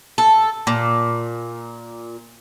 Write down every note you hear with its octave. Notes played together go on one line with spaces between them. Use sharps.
A4
A#2